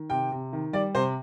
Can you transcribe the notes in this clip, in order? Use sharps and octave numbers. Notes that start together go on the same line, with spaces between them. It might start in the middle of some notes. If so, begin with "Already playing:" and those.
Already playing: D#3
C3 G5
C3
D#3
G3 D5
C3 C5